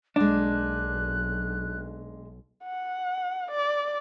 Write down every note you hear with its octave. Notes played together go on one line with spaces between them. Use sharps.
B1 G#3 A#3 D4 F#6
F#5
D5